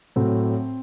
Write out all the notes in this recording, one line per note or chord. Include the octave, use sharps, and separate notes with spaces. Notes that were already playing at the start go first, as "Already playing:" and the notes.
A2 F#3 A3 C4